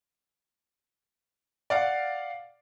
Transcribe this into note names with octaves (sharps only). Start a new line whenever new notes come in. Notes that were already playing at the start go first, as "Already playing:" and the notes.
D5 F5 F#5